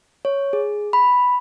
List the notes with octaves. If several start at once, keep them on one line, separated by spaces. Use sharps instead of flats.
C#5
G#4
B5